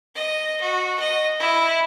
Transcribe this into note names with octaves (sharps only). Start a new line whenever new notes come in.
D#5
F#4
D#5
E4